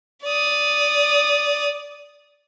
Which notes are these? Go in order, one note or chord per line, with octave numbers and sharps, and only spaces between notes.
D5 D#6